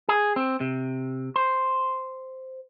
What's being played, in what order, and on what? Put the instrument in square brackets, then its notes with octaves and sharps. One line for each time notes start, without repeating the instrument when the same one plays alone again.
[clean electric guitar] G#4
C4
C3
C5